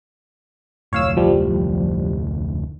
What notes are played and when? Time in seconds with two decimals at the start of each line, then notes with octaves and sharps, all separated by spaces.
0.93 F1 D2 A2 C#5 F5 E6
1.17 F3 G3